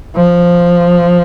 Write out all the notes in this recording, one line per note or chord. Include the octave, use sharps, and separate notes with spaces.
F3